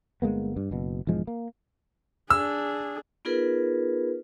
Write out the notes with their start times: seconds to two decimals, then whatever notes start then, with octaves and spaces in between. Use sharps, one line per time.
0.22 G1 G#3 A#3 B3
0.57 G2
0.71 F#1 B2
1.07 E1 G#2 F3 G#3
1.27 A#3
2.30 D4 G#4 E6
3.25 B3 D#4 F4 G#4 A#4 B4